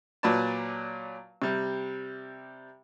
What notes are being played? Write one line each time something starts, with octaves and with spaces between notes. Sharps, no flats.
A#2 F#3 B4 D5 A5
C3 G3